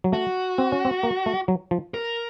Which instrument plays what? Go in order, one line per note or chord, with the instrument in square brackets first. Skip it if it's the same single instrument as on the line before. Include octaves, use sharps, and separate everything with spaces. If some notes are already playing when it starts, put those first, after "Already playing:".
[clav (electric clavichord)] F#3
[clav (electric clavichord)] A3 [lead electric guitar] F#4
[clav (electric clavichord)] C4
C#4
C4
A#3
A3
F#3
F3
[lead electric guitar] A#4